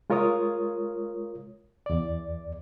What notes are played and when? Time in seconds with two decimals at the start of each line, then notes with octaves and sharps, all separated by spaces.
0.10 G#3 F4 A#4 C#5 D#6
1.86 E2 D5